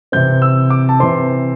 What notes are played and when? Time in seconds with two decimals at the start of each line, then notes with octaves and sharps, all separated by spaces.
0.12 C3 E3 C4 G6
0.42 E6
0.70 D6
0.89 A5
1.00 C3 E3 C4 C6